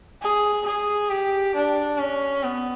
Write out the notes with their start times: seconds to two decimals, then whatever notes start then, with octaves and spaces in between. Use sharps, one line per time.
0.22 G#4
0.65 G#4
1.10 G4
1.55 D4
1.98 C#4
2.43 B3